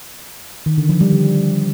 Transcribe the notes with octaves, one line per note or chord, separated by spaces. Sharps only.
D#3
D3
F3
G3
D3